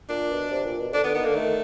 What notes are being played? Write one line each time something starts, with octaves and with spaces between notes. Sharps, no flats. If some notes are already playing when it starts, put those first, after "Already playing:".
A#2 D4
B2
C3
A#2
B2
D3 D4
D3 B3
D#3 B3
D3 A#3
D#3 A3